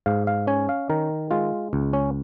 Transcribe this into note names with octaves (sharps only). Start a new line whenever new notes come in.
G#2 F5
F5
C#4 G#5
F5
D#3 A#4
G#3 F4
C#2
C#4